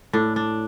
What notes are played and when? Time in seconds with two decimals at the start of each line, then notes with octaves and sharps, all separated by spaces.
0.13 A2 D4
0.36 D4